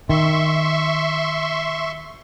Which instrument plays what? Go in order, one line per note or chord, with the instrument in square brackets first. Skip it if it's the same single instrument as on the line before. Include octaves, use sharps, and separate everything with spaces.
[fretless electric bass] D#3 [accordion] E5 C6 C#6